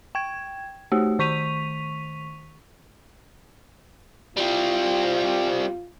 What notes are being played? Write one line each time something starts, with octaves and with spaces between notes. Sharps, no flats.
G5 G#6
A3 F#4 G4
D#3 C#6 B6 D#7 F7
G3 C4 F4